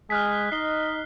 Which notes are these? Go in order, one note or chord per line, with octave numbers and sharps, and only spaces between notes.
G#3 G#4 F6 F#6 B6
D#4 D#5 C7 G7